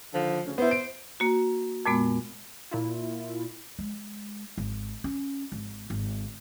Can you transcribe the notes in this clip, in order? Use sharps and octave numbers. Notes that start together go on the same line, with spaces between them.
D3 D#3 F3
D2 C#3 C#4
B3 E4 C5
D7
A#3 F#4
F2 A#2 G#3 B3
A#2 E4 F4
G#3
G#1
C#4
G#1
G#1